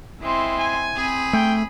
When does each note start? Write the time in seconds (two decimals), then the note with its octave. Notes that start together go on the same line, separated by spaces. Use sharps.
0.22 G#3 C4 E4 C6
0.59 G#5
0.96 C4 G#4 B5
1.33 A3 G5